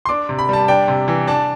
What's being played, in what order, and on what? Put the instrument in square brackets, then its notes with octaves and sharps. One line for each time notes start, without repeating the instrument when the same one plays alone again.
[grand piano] C6
D4 D6
C3
B5
G3 A5
D4 G5
C3
E3
D4 A5